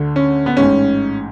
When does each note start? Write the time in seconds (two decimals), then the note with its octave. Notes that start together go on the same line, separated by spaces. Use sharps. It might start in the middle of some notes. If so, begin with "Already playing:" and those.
Already playing: D2 D3 A3
0.16 C#4
0.46 B3
0.57 A1 G#2 G#3 C#4